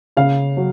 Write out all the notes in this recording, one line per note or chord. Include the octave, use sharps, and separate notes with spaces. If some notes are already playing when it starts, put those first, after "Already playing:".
C#3 F5
F#3